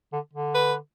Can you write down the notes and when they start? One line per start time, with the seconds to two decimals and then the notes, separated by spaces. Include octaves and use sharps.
0.13 D3
0.33 D3
0.54 B4